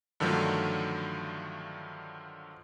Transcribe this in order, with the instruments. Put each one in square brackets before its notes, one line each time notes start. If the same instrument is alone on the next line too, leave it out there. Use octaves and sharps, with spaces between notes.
[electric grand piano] G2 D3 D#3 F3 F#3 A3